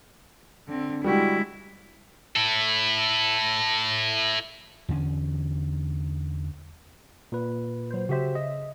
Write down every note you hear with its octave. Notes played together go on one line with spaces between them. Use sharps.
D3 C4
G3 G#3 E4 F#4 G4
E4 A4
E2 D3 B3 C#4
A#2 B4
F#3 C5
C#3 F#4 G4 C5 E5
D#5